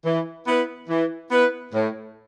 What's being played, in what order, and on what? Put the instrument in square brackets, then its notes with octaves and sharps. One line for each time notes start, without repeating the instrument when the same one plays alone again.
[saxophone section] E3
B3 E4 B4
E3
B3 E4 B4
A2